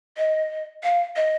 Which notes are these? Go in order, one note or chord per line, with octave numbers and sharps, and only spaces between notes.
D#5
F5
D#5